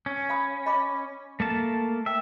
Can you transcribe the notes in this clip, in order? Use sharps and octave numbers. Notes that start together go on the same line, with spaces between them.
C#4
F5 B5 D#6
D#5 B5 D6
A3 A#3 A5
E5 G5